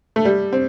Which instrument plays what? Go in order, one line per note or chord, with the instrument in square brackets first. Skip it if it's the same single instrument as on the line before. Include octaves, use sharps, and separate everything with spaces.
[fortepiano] A3
G3
C4